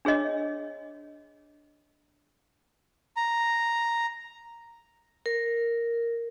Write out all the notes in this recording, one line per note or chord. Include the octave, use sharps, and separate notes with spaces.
D4 G#4 C#5 D#5
A#5
A#4